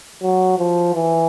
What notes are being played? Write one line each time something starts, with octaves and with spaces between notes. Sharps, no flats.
F#3
F3
E3